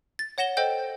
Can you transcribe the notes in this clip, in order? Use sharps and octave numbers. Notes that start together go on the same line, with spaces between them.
A6
C#5 F#5 A#6 E7 G7
A4 C5 D#5 G5 G6